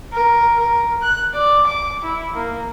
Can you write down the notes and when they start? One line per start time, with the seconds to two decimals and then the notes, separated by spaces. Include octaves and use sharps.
0.13 A#4
0.60 A#4
1.02 F#6
1.33 D5
1.67 D6
2.04 E4
2.36 A#3